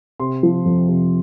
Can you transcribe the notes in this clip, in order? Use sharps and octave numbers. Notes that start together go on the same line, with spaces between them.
C3 C6
F3
F2
C3